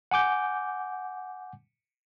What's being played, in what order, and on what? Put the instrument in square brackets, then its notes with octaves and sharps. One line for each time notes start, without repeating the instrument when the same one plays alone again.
[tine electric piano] F#5 G#5 D6 G6